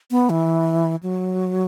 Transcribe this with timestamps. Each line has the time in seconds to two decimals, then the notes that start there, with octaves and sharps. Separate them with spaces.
0.11 B3
0.30 E3
1.03 F#3